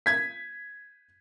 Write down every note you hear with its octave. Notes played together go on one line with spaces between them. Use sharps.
G#6 B6